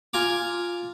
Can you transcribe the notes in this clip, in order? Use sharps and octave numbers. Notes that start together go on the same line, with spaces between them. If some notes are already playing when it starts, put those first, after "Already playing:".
F4 G#5 A#5 D6